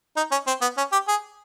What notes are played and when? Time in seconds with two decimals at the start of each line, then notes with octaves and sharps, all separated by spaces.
0.16 D#4
0.31 C#4
0.47 C4
0.61 B3
0.77 C#4
0.92 G4
1.08 G#4